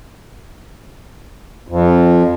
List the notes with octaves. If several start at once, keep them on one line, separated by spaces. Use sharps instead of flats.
F2